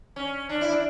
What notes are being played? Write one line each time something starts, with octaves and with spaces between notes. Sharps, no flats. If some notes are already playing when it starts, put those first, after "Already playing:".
C#4
D4
E4
D4